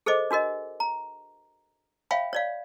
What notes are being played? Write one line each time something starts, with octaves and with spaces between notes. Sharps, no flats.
G#4 A4 C5 D#5 D6
D4 F#4 A#4 D#5
A#5
C#5 E5 F5 G5 B5
C#5 D5 F5